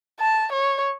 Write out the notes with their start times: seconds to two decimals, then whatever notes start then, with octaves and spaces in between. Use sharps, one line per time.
0.20 A5
0.52 C#5